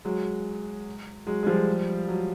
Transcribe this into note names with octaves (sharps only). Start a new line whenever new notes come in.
F#3 G#3
F#3 G#3
G#3
F3 G3
F#3